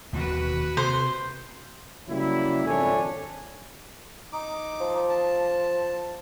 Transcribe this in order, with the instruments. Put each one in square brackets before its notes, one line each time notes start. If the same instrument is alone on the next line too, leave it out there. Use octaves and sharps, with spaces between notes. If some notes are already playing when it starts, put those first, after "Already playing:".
[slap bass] E1 D#2 B2 [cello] F#4 B4
[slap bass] C3 [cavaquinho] C5
[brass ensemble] C#3 F#3 G3 A#3 E4
G#1 F2 D4 A4 C#5 G#5
[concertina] D#4 D6
[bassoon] F3
[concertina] A5